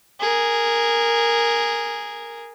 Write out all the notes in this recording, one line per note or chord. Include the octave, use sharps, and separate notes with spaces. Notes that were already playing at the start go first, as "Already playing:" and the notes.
G#4 A#4